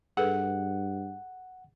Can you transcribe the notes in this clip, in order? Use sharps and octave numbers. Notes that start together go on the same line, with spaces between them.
G2 G#4 A4 B4 F#5